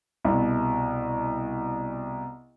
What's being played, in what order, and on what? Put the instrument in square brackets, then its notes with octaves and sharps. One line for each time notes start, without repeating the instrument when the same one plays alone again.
[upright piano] C2 B2